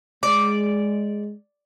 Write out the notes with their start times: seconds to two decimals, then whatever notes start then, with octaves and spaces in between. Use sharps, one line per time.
0.23 G#3 D5